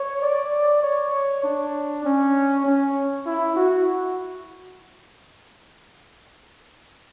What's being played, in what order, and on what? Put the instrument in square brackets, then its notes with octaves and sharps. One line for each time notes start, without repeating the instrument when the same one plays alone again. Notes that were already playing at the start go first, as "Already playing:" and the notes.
Already playing: [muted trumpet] C#5
D5
C#5
D4
C#4
C#4
E4
F#4